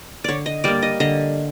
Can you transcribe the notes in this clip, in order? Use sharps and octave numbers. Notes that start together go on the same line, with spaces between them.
D3 C#5 D5
D#5
G3 A#3 D5
D#5
D3 D#5